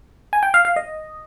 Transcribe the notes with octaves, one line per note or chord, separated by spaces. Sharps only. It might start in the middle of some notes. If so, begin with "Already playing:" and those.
G#5
G5
F5
F5
D#5